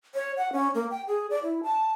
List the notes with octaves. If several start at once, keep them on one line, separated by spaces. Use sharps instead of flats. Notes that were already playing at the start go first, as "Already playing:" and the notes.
C#5
F#5
C#4
A#3
G5
G#4
D5
E4
A5